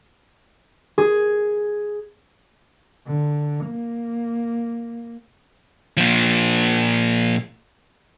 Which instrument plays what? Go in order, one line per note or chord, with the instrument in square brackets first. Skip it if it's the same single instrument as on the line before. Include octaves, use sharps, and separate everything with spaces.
[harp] G#4
[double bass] D3
A#3
[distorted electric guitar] A#2 F3